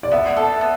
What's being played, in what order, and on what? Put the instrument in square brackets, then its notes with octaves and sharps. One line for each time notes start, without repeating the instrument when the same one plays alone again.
[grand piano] D5
[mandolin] B3 [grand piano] E5
[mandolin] A4
B3